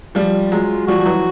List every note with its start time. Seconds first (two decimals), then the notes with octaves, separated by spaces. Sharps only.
0.15 F3 G3 F4
0.52 F#3 G#3
0.87 F3 G3 F#4
0.99 F3
1.06 E3 F#3